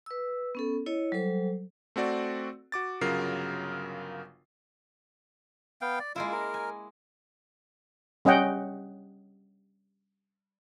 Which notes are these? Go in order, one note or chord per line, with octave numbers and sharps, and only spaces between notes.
B4 E6
B3 C#4 A4
E4 C#5 D#5
F#3 G3 A4 C5
A3 C4 F#4 D5
F#4 D6 A6
G1 C#3 F#3 F4 A#4 C7
B3 F5 G5
D5
G#3 A#3 E4 F4
A#4
G#5
G3 C#4 D#5 F#5 G5